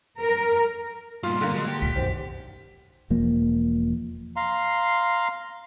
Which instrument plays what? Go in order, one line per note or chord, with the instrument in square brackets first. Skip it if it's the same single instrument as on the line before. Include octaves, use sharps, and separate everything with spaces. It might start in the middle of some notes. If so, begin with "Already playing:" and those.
[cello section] A#4
[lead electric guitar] G2 A#2 [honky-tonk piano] F4 [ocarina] C6
[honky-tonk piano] D3 A#3
[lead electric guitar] F#3 G#3
G4
[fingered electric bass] C#2 A#2 [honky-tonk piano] B6
[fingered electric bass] B1 F#2 D#3 [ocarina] C5
[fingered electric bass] E1 F3 A#3
[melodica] F5 A#5 C6